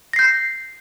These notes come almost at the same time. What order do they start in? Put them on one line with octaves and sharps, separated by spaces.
A#6 C7 G6